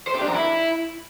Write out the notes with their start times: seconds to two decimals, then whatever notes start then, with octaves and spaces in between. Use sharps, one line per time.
0.07 C5
0.14 G4
0.21 D4
0.28 A#4
0.35 E4